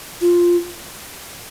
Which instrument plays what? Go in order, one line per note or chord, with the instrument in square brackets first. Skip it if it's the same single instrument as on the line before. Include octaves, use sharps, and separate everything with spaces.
[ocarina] F4